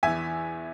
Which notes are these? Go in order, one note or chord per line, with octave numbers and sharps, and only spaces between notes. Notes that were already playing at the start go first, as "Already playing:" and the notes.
E2 E3 E5 G#5